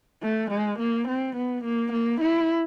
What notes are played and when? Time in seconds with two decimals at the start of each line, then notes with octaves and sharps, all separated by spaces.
0.23 A3
0.51 G#3
0.79 A#3
1.08 C4
1.36 B3
1.64 A#3
1.93 A#3
2.21 E4